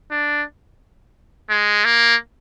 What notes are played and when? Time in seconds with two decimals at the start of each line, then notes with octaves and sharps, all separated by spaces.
0.11 D4
1.50 G#3
1.85 A#3